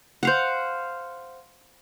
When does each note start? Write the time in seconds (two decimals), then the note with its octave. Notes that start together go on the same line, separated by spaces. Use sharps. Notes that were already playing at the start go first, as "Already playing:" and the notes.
0.23 C5 F5 F#5